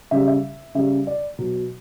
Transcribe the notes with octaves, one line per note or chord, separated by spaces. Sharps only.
C#3 G3 E5
E5
C#3 G3 E5
D5
B2 F#3